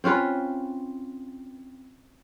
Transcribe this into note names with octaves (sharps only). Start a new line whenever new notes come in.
C4 C#4 F4 B4